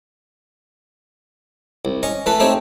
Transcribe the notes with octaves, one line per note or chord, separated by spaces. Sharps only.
C2
C#4 D#5 C#6
E3 A3 A4 B4
A3 C4 D#4 G4 C#5